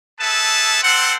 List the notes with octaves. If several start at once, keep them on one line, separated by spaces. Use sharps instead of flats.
G#4 A4 B4 E5 A5
C4 A4 C5 F#5